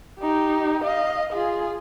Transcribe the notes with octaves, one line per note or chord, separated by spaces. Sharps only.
D#4 G4
D#5 F5
F4 G#4